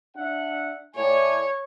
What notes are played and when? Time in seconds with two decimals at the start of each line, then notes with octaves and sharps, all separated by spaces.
0.17 D4 E5 F#5
0.96 A2 C#5 D5 G#5